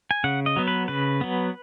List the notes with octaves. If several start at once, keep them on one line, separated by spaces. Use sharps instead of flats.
G#5
C#3 F#5
D#5
F#3 B3
B4
C#3 B4
F#3 B3